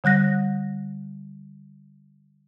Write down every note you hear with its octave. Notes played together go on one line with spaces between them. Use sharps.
D3 G3 F#6 A#6